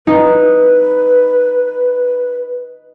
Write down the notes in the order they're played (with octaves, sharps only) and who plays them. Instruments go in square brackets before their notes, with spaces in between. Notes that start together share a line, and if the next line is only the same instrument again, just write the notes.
[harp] D#4 [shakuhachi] B4